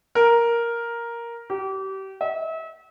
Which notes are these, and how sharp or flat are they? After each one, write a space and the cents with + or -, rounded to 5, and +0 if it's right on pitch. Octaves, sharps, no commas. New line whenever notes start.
A#4 +5
G4 -30
E5 -35